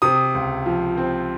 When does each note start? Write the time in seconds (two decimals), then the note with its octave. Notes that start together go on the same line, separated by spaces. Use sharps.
0.02 C3 D#6
0.34 C#2
0.66 F3
0.97 C4